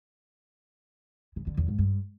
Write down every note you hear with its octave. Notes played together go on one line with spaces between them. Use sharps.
C#3
D3
E2
G#2
G2